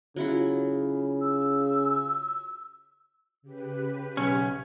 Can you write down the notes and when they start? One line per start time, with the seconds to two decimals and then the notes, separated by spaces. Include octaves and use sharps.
0.16 C#3 F#3 E4 F4
1.21 E6
3.42 C#3 G4 B4
4.17 B1 C#4